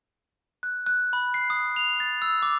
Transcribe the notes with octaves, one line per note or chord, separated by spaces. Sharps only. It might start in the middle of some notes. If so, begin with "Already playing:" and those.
F#6
F#6
B5
C7
D#6
F7
A6
E6
D6